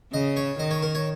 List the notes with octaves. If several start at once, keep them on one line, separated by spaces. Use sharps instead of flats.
C#3 D#5
C#5
D#3 D#5
C#5
A#4
C#5